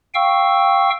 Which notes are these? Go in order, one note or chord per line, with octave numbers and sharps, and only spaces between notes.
F5 G5 C#6 E6